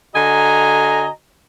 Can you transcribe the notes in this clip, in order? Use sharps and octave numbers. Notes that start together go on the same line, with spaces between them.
D3 F#4 D#5 G#5 A#5